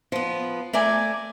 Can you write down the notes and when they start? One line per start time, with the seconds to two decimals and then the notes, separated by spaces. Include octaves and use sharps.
0.12 F3 B3
0.73 A3 A#4 D5 G#5